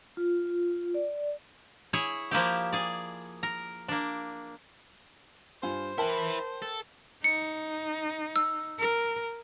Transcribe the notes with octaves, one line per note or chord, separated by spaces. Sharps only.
F4
D5
E4 G#4 C#5
F3 A#3 E4 G4
G#4 D5
A#4
A#3 D4
G2 F4 C5 G#5
E4 A#4 B4 G5 A5
A4
D#4 C#7
E6
A#4